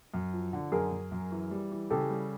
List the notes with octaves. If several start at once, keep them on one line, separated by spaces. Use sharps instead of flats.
F#2
F3
D3
F#2 G#4 A#4
F#2
F#2
E3
G3
E3
C#3 G4 A4
G3